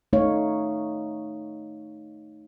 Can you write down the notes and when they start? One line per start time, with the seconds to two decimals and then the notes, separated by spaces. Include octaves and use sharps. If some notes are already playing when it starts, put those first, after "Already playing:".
0.13 A3 D#4 C#5 F5